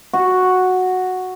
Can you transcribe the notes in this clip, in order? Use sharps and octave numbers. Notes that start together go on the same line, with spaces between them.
F#4